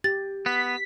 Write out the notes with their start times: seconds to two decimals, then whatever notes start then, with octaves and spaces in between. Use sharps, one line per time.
0.04 G4 A6
0.46 B3 B6